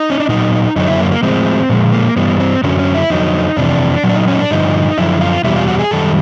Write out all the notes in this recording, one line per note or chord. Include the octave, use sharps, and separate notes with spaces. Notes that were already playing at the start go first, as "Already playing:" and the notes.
Already playing: D#4
C#4
D4
A#2 F#3 D#4
F#2 D3 F#3 D#4
E4
A#3
A#3
A2 F3 G#3 C4
A#2 F3 G#3 B3
A#3
G2 E3 G3 B3
C4
F#2 D3 F#3 C#4
C#4
E4
F2 D3 F#3 D#4
F2 C3 E3 D4
A#2 F#3
D4
D#4
C#4
D#4
D4
G2 D3 F3 D#4
F#2 D3 F3 E4
F4
E2 B2 G3 E4
F4
F#4
G#4
F#2 D#3 G3 A4